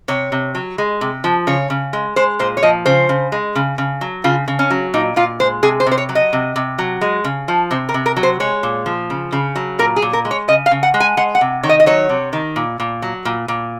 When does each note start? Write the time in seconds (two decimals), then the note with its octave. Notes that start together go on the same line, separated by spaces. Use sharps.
0.08 C3 C#5
0.32 C3
0.55 F#3
0.78 G#3
1.01 C3
1.24 F3
1.47 C#3 C#5
1.70 C#3
1.93 G#3
2.16 G#3 C5
2.39 A#2 C5
2.57 C#5
2.63 F3 D#5
2.86 C#3 C5
3.09 C#3
3.32 G#3
3.55 C#3
3.78 C#3
4.01 F#3
4.24 C#3 F4
4.48 C#3
4.59 C#4
4.70 F#3
4.94 A#2 D#4
5.16 A#2 F4
5.40 G#3 C5
5.63 C3 G#4
5.80 C5
5.86 C3
5.91 C5
5.98 C#5
6.09 F#3
6.15 D#5
6.33 C3
6.56 C3
6.79 F#3
7.01 G#3
7.24 C#3
7.48 F3
7.71 C3 C5
7.89 A#4
7.94 C3
8.06 A#4
8.17 F#3
8.23 C5
8.40 G#3 C#5
8.63 A#2
8.86 F3
9.10 C#3
9.32 C#3
9.56 F#3
9.79 A#2 A#4
9.96 G#4
10.02 A#2
10.13 A#4
10.25 G#3
10.31 C#5
10.48 C#3 D#5
10.66 F5
10.71 C#3
10.83 F#5
10.94 G#3
11.00 G#5
11.17 G#3 F#5
11.35 F#5
11.41 C3
11.63 D#3 C#5
11.69 D#5
11.80 D#5
11.86 F#3 C#5
12.09 C3
12.33 D#3
12.56 A#2
12.80 A#2
13.02 F#3
13.25 A#2
13.48 A#2